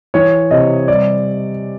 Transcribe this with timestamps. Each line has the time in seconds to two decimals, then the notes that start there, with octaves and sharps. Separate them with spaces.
0.14 E3 C#5
0.51 C3 D#5
0.88 G3 D5